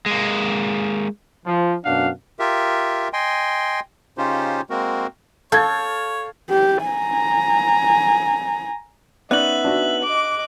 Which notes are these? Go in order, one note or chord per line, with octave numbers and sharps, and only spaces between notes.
G#3 A#3
F3
F#2 B2 D4 F5 F#5
F4 G4 A#4 E5
D#5 G5 G#5 C6
C#3 C#4 D#4 F4 G4 C5
G#3 A#3 C4 F#4 A#4
A4 C#5 F5 A5 G6 G#6
G4
G#5 A#5
B3 C#4 D#4 D5 E5 F#6 F#7
D4 F#4
D#5 D6